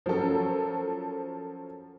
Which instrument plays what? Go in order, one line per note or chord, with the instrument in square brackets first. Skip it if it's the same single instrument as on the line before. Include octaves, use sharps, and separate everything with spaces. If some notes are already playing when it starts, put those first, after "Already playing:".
[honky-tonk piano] F3 F#3 C#4 A4 A#4